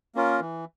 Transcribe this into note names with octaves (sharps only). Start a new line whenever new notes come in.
A#3 C#4 F4 A#4
E3